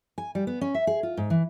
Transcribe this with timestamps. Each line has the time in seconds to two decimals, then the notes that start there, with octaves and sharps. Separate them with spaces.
0.18 G#5
0.35 G3
0.47 B3
0.61 C#4
0.74 E5
0.87 G#4
1.03 F4
1.17 G#2
1.30 E3